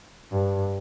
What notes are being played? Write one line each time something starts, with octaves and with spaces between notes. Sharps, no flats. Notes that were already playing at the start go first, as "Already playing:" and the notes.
G2